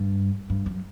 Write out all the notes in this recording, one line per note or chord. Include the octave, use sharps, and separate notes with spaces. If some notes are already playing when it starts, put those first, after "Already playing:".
Already playing: G2
G2
F#2